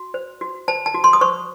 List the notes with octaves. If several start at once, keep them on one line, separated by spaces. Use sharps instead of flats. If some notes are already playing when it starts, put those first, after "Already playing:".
Already playing: F#4
C5
F#4
C5 A5
A5
F#4
C6
D#6
C5 C#6